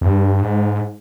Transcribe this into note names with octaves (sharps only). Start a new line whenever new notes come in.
E2
G2
G#2